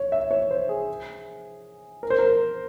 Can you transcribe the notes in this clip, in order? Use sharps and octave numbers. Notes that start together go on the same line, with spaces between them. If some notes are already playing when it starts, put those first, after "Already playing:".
Already playing: C#5
E5
C#5
C5
G#4
A#4
C5
A#4